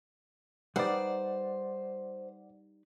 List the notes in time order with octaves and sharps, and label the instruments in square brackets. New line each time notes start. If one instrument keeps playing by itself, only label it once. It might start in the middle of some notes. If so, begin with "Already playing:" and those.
[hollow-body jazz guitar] G3 D#4 B4 [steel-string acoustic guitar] C5 [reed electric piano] D5 F#5